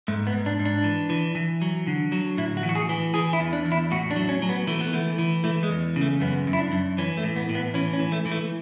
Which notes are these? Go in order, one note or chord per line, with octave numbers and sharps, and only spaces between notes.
G#2 A3
B3
G#2
D4
G#2
D4
E3
E3
E3
F#3
D3
F#3
A2 E4
F#4
E3
F#4
G#4
E3
E3 G#4
E4
E2
D4
E2
E4
A2 F#4
D4
F#3
C#4
F#3
B3
E3 A3
B3
E3 A3
E3
E3 A3
G#3
E2
C#3
A3
F#2 B3
F#2
E4
D4
F#2
E3 C#4
A3
A2
B3
A2
B3
E3 C#4
C#4
E3
A3
E3
A3